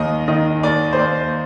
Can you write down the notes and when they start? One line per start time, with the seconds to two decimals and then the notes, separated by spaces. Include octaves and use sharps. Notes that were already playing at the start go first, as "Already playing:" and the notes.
Already playing: D#2 D#3 D#5
0.28 D#3 D#5
0.63 D#2 D5
0.93 C5
0.99 D#2 D5